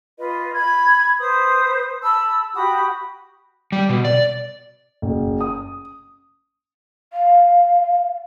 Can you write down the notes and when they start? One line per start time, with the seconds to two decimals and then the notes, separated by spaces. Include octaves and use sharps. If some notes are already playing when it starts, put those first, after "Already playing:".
0.18 F4 B4 D#5
0.53 B5 G#6
1.18 B4 C5 D#6
2.02 A5 B5 E6
2.54 F#4 G4 B5 D#6
3.72 G3
3.89 B2
4.05 D5
5.02 F#1
5.41 D#6
7.13 F5